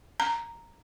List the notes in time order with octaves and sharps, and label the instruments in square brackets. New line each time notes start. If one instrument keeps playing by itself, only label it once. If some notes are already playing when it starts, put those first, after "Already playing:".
[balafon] A#5